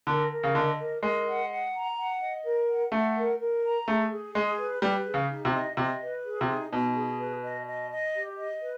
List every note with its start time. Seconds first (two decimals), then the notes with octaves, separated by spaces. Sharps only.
0.07 D3 A#4
0.32 A#4
0.44 C#3
0.55 D3 D#5
0.79 A#4
1.02 G#3 A#4
1.26 F#5
1.50 F#5
1.74 A#5
1.97 F#5
2.20 D#5
2.45 A#4
2.69 F#5
2.92 A3 F#5
3.16 A#4
3.40 A#4
3.63 A#5
3.87 A3 G#4
4.11 G#4
4.35 G#3 G#4
4.58 B4
4.82 G3 B4
5.06 G#4
5.14 C#3
5.30 D#4
5.45 C3
5.53 D#5
5.77 C3 D#5
6.01 B4
6.25 G#4
6.41 C3
6.48 D#4
6.72 B2 D#4
6.96 G#4
7.19 B4
7.43 D#5
7.66 D#5
7.91 D#5
8.15 G4
8.39 D#5
8.62 B4